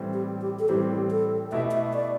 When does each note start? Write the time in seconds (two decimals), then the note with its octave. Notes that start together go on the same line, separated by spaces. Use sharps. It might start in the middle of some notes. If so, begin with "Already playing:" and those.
Already playing: A2 E3 G3 C4
0.13 G4
0.41 G4
0.59 A4
0.69 A2 E3 G3 C4 G4
1.10 A4
1.52 B2 A3 E4 G4 E5
1.71 E5
1.93 D5